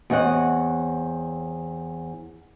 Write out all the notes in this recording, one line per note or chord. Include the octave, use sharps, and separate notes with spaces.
E2 C4 C#5 D#5 F#5